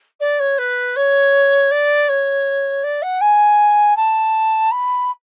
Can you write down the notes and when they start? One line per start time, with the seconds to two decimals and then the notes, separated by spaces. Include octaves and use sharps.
0.20 D5
0.39 C#5
0.58 B4
0.96 C#5
1.71 D5
2.08 C#5
2.83 D5
3.02 F#5
3.21 G#5
3.96 A5
4.71 B5